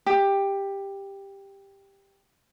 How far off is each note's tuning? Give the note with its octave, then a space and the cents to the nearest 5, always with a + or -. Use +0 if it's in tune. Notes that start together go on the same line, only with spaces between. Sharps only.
G4 +10